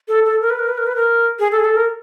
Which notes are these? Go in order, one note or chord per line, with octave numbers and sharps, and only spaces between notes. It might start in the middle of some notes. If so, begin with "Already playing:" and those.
A4
A4
A#4
B4
A#4
B4
A#4
B4
A#4
G#4
A4
G#4
A4
A#4